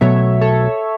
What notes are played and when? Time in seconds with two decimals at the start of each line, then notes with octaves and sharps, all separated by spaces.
0.01 B1 B2 F#3 A3 C#5 E5
0.41 A4 C#5